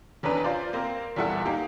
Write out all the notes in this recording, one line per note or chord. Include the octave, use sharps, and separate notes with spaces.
F1 E2 C#4 D4 B4 A#5
F4 C5 D5
A#3 C4 A#4
E2 A#2 G3 E4 A4 F#5
A#3 D#4 G4